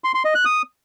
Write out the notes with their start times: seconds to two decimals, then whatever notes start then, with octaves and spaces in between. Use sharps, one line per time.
0.04 C6
0.14 C6
0.25 D#5
0.35 F#6
0.45 D#6